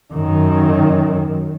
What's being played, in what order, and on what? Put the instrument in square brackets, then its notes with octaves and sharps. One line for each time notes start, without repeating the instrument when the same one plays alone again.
[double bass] F#2 D#3